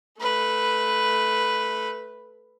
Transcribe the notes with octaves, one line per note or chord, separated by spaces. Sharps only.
A3 B4